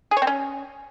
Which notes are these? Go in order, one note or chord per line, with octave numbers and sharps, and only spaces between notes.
G#4
C#5
C4
C#4